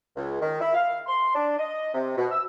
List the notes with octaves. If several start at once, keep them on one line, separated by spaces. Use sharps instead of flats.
C#2
D#3
E4
F5
C6
D4
D#5
C3
B2
E6